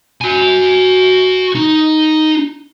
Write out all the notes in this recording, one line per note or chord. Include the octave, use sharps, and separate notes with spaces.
F#4 G#5
D#4